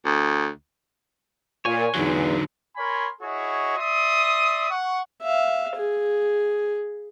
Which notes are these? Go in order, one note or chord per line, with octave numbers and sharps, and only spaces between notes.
D2
A#2 C#5 G#5
E2 D3 F#3 D#4
A#4 C#5 G#5 B5 C6
E4 F#4 G#4 C#5 D#5
D5 E5 C6 D#6
F#5 C#6
E5 F5
G#4